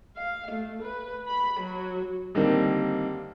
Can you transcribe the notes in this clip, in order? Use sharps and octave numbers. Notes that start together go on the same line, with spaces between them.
F5
A3
B4
B5
F#3
D3 D#3 G3 A#3 C4